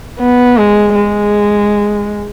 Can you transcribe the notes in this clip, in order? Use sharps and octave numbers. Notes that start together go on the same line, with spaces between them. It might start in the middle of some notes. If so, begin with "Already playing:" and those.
B3
G#3
G#3